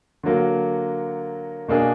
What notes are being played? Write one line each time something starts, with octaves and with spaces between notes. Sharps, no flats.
D3 F#3 A#3
B2 A#3 D4 G#4